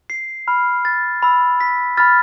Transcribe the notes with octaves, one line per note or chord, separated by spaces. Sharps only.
C7
B5 F6
A6
B5 E6
B6
B5 F6 A6